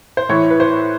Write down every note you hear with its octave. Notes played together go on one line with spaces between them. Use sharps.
C5
A2 E3 C#5
B4
C5